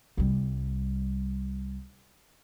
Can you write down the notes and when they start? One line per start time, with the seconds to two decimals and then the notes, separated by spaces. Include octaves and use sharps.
0.17 C2 G3